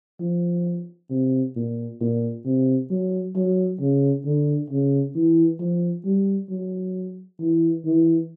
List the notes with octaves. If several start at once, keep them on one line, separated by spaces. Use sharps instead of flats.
F3
C3
A#2
A#2
C3
F#3
F#3
C#3
D3
C#3
E3
F3
G3
F#3
E3
E3